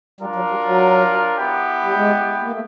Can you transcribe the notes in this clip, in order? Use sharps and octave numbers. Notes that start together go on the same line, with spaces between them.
G3 D4 F4 A#4
F#3
G3
F#3
B3 E4 G4
G3
G#3
A#3
A3